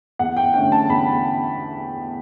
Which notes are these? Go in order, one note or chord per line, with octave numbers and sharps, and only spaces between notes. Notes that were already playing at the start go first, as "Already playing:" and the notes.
E2 F#5
G5
D3 A3 C#4 G5
A5
E2 B5